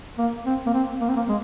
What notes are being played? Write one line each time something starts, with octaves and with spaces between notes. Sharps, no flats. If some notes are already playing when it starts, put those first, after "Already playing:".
A#3
C4
A#3
C4
A#3
C4
A#3
G#3